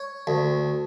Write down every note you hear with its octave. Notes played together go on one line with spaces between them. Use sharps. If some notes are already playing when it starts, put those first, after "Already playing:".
Already playing: C#5
D2